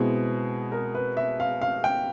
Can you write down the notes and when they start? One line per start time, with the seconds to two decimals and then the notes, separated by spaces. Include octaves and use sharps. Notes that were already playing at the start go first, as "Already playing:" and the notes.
Already playing: B2 G#3 C4 E4 G#4
0.72 A#4
0.95 B4
1.17 E5
1.40 F5
1.61 F5
1.84 G5